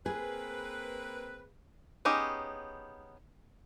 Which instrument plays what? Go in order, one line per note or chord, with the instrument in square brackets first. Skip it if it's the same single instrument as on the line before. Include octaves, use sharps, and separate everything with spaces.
[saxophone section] A#3 C4 B4 [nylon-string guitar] G#4
[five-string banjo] B3 C#4 D#4 G4 G#4